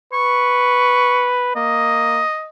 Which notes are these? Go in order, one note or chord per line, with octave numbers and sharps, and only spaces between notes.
B4 C#6
A#3 D#5